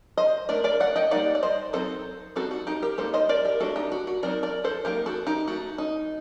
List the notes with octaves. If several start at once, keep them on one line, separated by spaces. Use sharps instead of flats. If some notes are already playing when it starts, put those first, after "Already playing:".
C5 D#5
A3 D4 A#4 D5
A#4 D5
D5 F#5
D#5 G5
G3 A#3 D#4 D5 F#5
D5
C5 D#5
F#3 C4 D#4 A4 C5
G3 C4 D#4 F#4 A4
F#4
D#4 G4
G4 A#4
G3 A#3 D#4 A4 C5
C5 D#5
A#4 D5
G4 A#4
A3 D4 F#4 A4
D#4 G4
F#4
F#4
F#3 C4 D#4 A#4 D5
A#4 D5
A4 C5
F#3 A#3 D#4 G4 A#4
F#4 A4
D#4 G4
A3 D#4 F#4
D#4